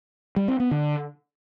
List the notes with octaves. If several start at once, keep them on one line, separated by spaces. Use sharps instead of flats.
G3
C4
B3
D3